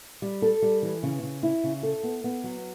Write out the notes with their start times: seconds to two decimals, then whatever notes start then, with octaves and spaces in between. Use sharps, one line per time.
0.22 G3
0.42 A4
0.62 G3
0.82 E3
1.03 C#3
1.23 C#3
1.43 E4
1.64 C#3
1.83 A4
2.03 B3
2.24 B3
2.44 F#3